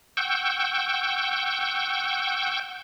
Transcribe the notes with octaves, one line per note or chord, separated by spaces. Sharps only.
F#5 G5 C#6 E6 G6